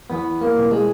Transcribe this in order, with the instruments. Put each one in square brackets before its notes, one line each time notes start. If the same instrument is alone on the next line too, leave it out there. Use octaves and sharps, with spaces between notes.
[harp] E2 [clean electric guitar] B3
[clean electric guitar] A#3
[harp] B2 G3 C4 F4
[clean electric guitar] G#3